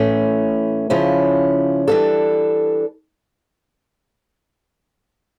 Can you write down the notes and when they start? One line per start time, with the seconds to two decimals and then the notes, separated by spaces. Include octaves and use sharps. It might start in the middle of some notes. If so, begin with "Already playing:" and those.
Already playing: A2 E3 A3 C#4
0.90 C#3 F3 C#4 E4
1.88 E3 G3 D4 A4